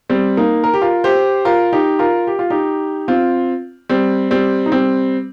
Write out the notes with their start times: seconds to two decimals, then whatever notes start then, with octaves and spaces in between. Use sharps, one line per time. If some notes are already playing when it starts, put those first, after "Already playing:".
0.10 G3 C4
0.37 A#3 D#4
0.64 A#4
0.74 G4
0.82 F4 A#4
1.04 G4 C5
1.45 F4 A#4
1.73 D#4 G4
1.99 F4 A#4
2.27 G4
2.39 F4
2.50 D#4 G4
3.08 C4 F4
3.89 G3 C4
4.31 G3 C4
4.66 D#4
4.72 G3 C4